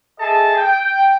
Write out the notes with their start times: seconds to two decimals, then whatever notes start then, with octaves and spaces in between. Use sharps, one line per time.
0.19 G#4 A4 D#5 E5 A5
0.56 G5